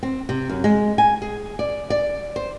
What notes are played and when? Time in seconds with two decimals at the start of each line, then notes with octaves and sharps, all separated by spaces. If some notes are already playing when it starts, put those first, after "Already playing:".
0.03 C4
0.29 C3
0.49 F#2
0.64 G#3
0.98 G#5
1.22 G#4
1.59 D5
1.90 D5
2.36 C5